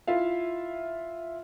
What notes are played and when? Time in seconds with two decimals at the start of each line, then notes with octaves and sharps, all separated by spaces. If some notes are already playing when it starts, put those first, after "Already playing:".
0.07 E4 F4 E5 F5